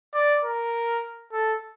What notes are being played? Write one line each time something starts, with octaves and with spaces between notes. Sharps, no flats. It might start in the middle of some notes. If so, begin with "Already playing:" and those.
D5
A#4
A4